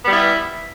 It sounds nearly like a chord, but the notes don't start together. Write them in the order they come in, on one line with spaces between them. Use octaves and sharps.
B3 G3 E4